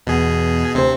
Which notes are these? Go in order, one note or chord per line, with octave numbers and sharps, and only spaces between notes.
E2 B2 G#4
D2 C3 C4 C5